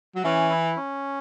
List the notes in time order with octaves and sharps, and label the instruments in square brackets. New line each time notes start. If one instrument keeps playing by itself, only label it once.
[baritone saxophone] F#3
[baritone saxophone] E3 [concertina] C#4
[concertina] E4
C#4